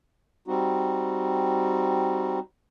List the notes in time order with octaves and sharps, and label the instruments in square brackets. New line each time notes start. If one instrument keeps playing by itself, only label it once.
[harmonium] G3 C4 D#4 F#4